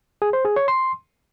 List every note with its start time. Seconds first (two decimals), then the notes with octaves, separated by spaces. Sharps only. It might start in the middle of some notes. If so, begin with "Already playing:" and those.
0.22 G#4
0.33 C5
0.45 G#4
0.56 C#5
0.68 C6